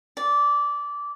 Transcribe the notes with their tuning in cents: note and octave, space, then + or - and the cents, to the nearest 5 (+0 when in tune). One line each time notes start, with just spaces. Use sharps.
D5 -15